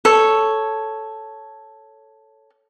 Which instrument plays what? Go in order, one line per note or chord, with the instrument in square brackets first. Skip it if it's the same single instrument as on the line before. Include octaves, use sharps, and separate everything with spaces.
[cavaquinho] A4 C#5